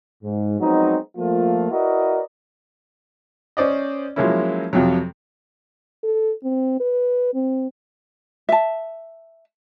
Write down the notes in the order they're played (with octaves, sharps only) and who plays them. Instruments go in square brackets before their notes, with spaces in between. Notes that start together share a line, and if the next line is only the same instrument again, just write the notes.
[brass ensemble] G#2
F3 F#3 G#3 B3 C4 D#4
F3 A3 A#3 F4
E4 F#4 A#4 B4 D5 D#5
[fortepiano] C#4 C5 D5 D#5
F3 F#3 G#3 A#3 C#4 E4
F2 C3 F3 F#3
[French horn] A4
C4
B4
C4
[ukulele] E5 A5